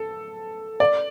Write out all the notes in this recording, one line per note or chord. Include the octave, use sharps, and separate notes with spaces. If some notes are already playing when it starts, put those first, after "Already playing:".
Already playing: A4
D5